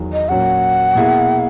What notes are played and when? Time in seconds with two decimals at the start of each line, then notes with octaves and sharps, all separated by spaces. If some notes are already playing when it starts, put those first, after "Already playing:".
Already playing: E2 D#3 F#3
0.13 D#5
0.29 A#2 F#3 C#4 F#4 F#5
0.95 B2 A#3 E4 G#4